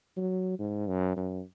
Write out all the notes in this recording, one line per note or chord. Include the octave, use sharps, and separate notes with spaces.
F#3
G#2
F#2
F#2